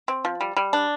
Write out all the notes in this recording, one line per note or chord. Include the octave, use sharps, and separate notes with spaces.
C4
F3
G3
G3
D4